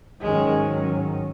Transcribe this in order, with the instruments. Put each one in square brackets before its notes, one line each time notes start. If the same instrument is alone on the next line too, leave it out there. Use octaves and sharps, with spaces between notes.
[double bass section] G#2 D#3 F#3 C#4 [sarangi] G#3